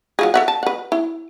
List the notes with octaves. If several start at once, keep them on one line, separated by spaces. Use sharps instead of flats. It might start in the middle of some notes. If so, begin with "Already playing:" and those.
F#3 F4 G#4
A4 E5 F#5
A5
B4 F#5
E4